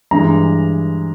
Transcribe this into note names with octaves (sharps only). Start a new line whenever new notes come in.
G2 E3 G#3 A#5